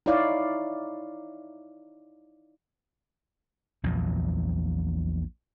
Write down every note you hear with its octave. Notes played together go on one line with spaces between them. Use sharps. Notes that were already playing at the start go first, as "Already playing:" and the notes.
D#4 E4 C#5 D5 F5
A#1 E2 A#2 F#3